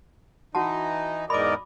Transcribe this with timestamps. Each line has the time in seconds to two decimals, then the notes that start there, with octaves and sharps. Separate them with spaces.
0.55 E3 D#4 F#4 F#5 A5
1.30 E2 G#2 A#4 D5 D#5 B5 D6